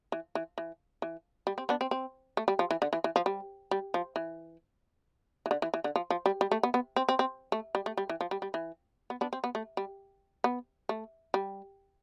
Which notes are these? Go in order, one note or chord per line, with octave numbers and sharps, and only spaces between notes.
E3
E3
E3
E3
G3
C4
B3 D4
C4
C4
A3
G3
F3
E3
D3
E3
E3
F3
G3
G3
F3
E3
E3
D3
E3
E3
D3
F3
F3
G3
G3
A3
B3
B3
C4
C4
C4
A3
G3
A3
G3
E3
F3
G3
G3
E3
B3
B3 D4
C4
B3
A3
G3
B3
A3
G3